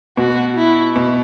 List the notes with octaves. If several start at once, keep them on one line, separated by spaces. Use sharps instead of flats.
B2 F#4
E4
B2